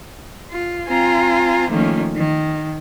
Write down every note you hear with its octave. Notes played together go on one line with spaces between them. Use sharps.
F4
C4 F4 G#5 A#5
D#3 F3 A3 A#3 C#4 F4
D#3